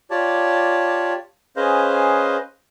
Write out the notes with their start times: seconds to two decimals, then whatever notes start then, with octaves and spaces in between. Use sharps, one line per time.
0.11 F4 G4 C#5 D5 A5
1.56 C#4 G#4 B4 C5 D#5 F5